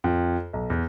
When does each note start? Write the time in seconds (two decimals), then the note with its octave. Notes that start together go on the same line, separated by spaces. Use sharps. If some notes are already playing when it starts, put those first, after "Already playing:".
0.04 F2
0.53 B1
0.70 E2